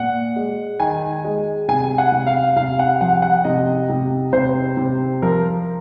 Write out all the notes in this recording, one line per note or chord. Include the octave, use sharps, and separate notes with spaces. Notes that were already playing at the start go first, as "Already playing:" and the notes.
Already playing: A#2 F#5
G#3
D#3 G#5
G#3
C3 G#5
F#5
C3
F5
C3 F5
F#5
F3 F#5
F#5
C3 D#5
C3
C3 C5
C3
F3 A#4